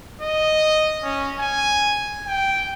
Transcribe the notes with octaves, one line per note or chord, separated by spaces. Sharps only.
D#5
C#4
G#5
G5